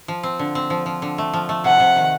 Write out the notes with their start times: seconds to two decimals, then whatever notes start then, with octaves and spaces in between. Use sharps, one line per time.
0.08 F3
0.23 C4
0.39 D3
0.55 C4
0.70 F3
0.86 F3
1.02 D3
1.18 A3
1.33 F3
1.49 A3
1.64 C3 F#5
1.80 C3
1.96 D#3